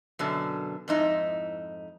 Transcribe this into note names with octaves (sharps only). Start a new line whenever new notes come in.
F#2 B2 D3
F2 G#2 D#4 E4